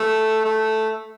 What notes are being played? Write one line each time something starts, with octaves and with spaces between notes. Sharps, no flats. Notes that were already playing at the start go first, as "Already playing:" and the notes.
Already playing: A3
A3